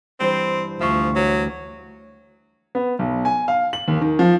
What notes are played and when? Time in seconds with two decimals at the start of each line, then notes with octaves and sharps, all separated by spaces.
0.20 G2 E3 C4 C5
0.81 D2 F3 E5 C6 C#6
1.15 F#3
2.75 B3
2.99 B1
3.25 G#5
3.48 F5
3.73 F#7
3.88 D#2
4.01 D#3
4.19 F3